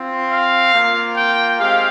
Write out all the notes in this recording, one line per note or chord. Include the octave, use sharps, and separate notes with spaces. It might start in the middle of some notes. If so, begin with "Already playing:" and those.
Already playing: C4 F4
F5
A#3 F4
G5
G#3 C4 G4 F5